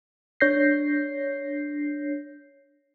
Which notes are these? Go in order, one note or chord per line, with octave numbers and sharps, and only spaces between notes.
D4 C#5 G6 A#6 C7